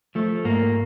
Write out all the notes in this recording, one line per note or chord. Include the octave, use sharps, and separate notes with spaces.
F3 A3
G#2 A#3